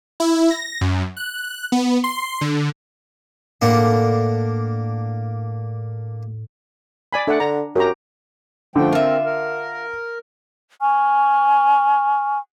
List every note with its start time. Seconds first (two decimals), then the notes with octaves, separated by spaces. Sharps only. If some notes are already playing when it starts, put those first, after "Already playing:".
0.20 E4
0.51 A#6
0.81 F#2
1.17 F#6
1.72 B3
2.04 C6
2.41 D3
3.62 A2 A#3 D4 F#5
7.13 D5 G#5 B5
7.27 A3 D4 D5 F#5
7.40 D3 A#5
7.76 F#2 F#4 G4 A#5
8.76 D3 F3 A3 G5
8.93 C4 F4 A#4 E5
9.25 A#4
10.82 G#5 C#6 F6